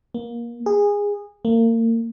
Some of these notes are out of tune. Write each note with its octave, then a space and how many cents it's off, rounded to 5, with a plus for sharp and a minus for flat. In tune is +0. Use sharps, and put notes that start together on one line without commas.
A#3 +25
G#4 -20
A#3 -35